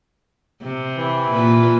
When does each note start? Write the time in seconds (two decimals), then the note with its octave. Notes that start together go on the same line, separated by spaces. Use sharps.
0.63 C3
0.96 E3
1.31 A#2 F4 B4